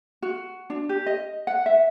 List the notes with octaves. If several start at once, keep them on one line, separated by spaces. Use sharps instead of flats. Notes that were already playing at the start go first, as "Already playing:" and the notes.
F#4
D4
G4
D#5
F#5
E5